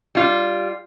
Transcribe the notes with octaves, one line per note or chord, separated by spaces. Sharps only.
G3 F4